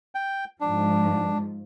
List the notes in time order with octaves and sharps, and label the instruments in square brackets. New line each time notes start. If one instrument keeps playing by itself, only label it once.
[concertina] G5
[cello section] G#2 F3 [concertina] D4